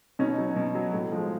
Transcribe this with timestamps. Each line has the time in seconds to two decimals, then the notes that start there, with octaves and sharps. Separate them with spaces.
0.19 B2 C#4 D#4
0.38 F#3
0.56 B2
0.75 F#3
0.93 A2
1.12 F3 G#3